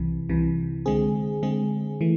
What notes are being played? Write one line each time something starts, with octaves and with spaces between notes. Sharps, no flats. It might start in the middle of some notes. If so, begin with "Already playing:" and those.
Already playing: C2 C3 E3
C2 C3 E3
D3 G#3 C4 G#4
D3 G#3 C4 G#4
E3 A3